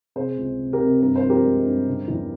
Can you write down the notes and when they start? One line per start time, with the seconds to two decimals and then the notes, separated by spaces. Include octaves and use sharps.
0.16 C3 G#4 C5
0.37 C#2
0.59 C3
0.73 G4 A#4
0.80 C3
1.01 G2 A#4
1.16 C5
1.23 F3
1.29 G4 A#4
1.45 G#3
1.66 G2
1.87 C#3
2.08 E2